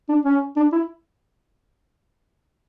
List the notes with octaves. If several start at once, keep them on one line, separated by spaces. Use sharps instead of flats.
D4
C#4
D4
E4